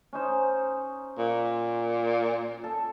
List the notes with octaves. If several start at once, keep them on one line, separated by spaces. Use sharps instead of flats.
C#4 D#4 C5
A#2
A4